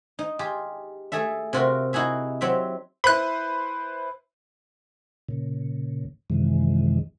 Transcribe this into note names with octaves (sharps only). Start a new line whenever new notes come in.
D#4
F4 G4 G#4
A3 G#4 A4 E5
C3 C4 F4 F#4 A#4
D#4 E4 F#4 G#4 E5
F#3 C4 G4 E5
E4 B4 C5 B5 F#6
A#2 C#3
F#2 C3 D#3 E3 G#3